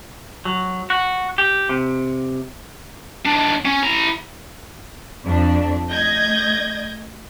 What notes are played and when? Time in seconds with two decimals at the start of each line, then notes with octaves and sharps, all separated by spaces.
0.45 F#3
0.90 F#4
1.38 G4
1.69 C3
3.25 D#2 D4
3.65 C#4
3.83 E4 A#5
5.25 F2 D4
5.91 A3 D#5 G6 G#6 A#6